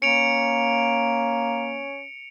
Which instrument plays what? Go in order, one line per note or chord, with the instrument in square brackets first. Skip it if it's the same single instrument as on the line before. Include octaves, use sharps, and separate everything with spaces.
[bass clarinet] A#3 [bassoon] C#4 [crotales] C#7 D7 F7